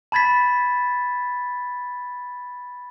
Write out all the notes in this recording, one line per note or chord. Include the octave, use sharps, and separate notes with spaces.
A5 B5 G#6 A6 B6